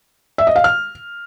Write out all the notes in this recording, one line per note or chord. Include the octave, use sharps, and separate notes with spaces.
E5
D#5
F5
F6